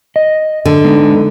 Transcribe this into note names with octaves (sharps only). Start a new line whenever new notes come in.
D#5
D3
G#3 B3 D#4